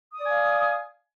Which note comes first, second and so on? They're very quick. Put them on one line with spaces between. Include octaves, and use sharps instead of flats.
D#6 D5 G#5 F5